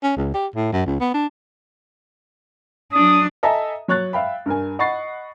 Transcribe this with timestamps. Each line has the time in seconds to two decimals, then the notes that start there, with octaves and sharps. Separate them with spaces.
0.03 C#4
0.17 C#2
0.34 G4
0.55 A2
0.73 F#2
0.86 C#2
1.00 B3
1.14 D4
2.93 F#3 D4 D#6
3.43 A4 D#5 E5 G#5 A#5
3.88 F#3 C#5 F#6 A6
4.13 E5 F5 G5 B5
4.46 G2 A#4 G#5
4.79 D#5 F#5 B5 C#6 A6 C7